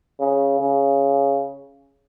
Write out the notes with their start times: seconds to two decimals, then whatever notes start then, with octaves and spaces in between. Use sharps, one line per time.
0.19 C#3
0.60 C#3